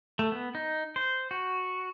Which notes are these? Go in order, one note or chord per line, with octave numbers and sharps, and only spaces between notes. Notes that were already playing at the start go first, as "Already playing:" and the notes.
A3
B3
D#4
C5
F#4